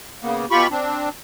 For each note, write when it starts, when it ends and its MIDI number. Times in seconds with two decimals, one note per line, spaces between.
0.22 0.46 49
0.22 0.46 58
0.22 0.46 59
0.51 0.67 47
0.51 0.67 65
0.51 0.67 67
0.51 0.67 83
0.51 0.67 85
0.70 1.09 60
0.70 1.09 62